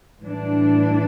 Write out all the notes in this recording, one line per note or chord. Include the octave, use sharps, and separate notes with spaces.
A2 E3 G3 D4